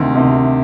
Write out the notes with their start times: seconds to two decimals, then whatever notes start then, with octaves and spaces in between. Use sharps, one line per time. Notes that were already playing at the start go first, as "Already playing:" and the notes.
Already playing: D2 C3 D#3
0.15 D2 C3 D#3